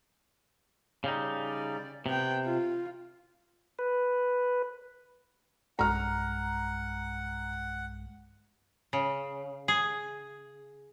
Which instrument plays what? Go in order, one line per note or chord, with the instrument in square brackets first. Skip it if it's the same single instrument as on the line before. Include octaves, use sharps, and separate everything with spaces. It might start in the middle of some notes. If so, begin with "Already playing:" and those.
[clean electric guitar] C#3 G3 D#4
[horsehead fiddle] D5
[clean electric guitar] C3 [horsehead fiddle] B3 G5
[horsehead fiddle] F4
[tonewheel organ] B4
[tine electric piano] B1 G2 G#3 [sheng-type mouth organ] F#5 [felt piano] A#5 F6
[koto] C#3
G#4